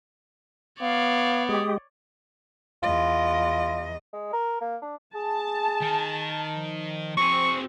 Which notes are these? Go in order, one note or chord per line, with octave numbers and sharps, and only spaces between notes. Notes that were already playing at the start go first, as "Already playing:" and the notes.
B3 C#5 D5 F5
G#3 G4 D#6
E2 F4 D#5
G#3
A#4
A#3
D4
G#4 A5
D#3
F3
C4 F#4 G#4 C#6